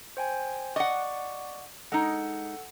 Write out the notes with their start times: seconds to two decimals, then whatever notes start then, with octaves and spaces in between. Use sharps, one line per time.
0.17 C5 G5 G#5
0.76 D5 D#5 F#5 C#6 D6
1.92 G#3 D#4 A4 F#5